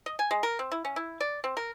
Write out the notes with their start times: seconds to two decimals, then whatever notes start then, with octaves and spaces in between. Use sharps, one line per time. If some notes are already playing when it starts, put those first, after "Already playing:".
0.06 D#5
0.19 G#5
0.31 G#3
0.43 A#4
0.59 C4
0.72 E4
0.85 C#4
0.96 E4
1.20 D5
1.44 C4
1.57 A#4